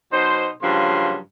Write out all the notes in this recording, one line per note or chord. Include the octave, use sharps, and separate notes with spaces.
B2 F#3 D#4 C5
G2 C#3 F3 F#3 A#3 C6